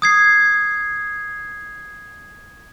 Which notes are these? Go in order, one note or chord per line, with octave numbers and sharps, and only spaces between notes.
D#6 G#6 C7